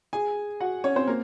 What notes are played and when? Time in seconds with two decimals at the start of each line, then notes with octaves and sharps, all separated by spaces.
0.13 G#4 G#5
0.60 F#4 F#5
0.84 C#4 C#5
0.96 C4 C5
1.07 A#3 A#4